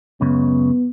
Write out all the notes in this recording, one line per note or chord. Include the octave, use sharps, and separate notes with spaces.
C#2 F#2 C#3 B3